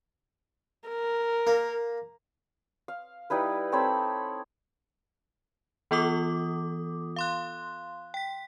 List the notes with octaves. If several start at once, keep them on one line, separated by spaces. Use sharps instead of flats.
A#4
A#3
F5
G3 D#4 E4 B4
C4 A4 C#5 B5
E3 B3 F4 A4 D6 D#6
F5 C6 F#6
G5 B6